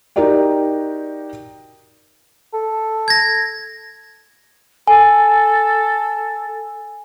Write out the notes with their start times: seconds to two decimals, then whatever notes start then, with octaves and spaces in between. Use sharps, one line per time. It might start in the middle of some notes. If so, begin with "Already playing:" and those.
0.16 D#4 F#4 G4 A#4 D5 G5
2.53 A4
3.08 G#6 A#6
4.87 A4 G#5